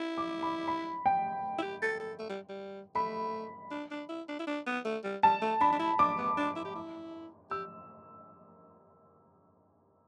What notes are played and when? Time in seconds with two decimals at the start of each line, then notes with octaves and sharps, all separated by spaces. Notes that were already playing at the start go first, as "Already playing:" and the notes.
Already playing: E4
0.18 D6
0.43 B5
0.68 B5
1.06 G5
1.59 E4
1.62 G4
1.82 A4
2.00 A4
2.19 A3
2.30 G3
2.49 G3
2.95 A3 B5
3.71 D4
3.91 D4
4.09 E4
4.29 D4
4.40 E4
4.47 D4
4.67 B3
4.85 A3
5.04 G3
5.23 G3 A5
5.42 A3
5.61 D4 B5
5.73 D4
5.79 E4
5.99 D4 D6
6.18 B3
6.37 D4
6.56 E4
6.65 G4
6.75 E4
7.51 G4 E6